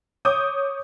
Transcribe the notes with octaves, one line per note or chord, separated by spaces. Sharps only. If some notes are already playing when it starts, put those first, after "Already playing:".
C#5 D6 D#6 G6